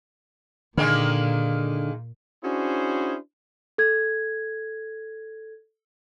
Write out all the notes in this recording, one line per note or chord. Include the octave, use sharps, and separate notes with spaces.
A#2 D3 D#3 G#3 A#3
C#4 D4 E4 F#4 G#4 C5
A4 G#6